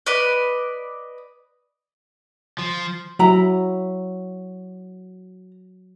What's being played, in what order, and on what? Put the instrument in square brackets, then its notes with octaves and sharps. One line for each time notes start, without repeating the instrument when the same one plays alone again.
[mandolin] B4 D5 D#5
[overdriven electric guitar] F3
[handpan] F#3 [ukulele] E4 A#5